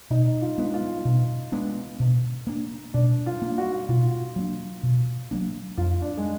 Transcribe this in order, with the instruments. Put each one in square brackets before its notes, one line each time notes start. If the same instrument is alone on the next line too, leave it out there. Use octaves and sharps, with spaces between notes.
[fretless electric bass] B2 [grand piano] D#4
[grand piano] F4
[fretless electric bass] G#3 B3 D4
[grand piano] F4
[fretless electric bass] B2
G#3 B3 D4
B2
A#3 D4
[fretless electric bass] B2 [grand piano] D4
[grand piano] F4
[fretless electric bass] A#3 D4
[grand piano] F#4
[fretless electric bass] B2 [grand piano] F4
[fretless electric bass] F#3 A#3 D4
B2
F#3 A#3 D4
[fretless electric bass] F2 [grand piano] F4
[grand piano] D4
G#3